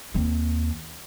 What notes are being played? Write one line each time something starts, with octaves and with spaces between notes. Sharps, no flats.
D#2 C4